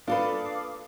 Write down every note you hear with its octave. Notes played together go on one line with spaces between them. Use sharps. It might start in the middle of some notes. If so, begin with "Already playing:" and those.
A#3 D4 F4 A4 B4 F5 D6 D#6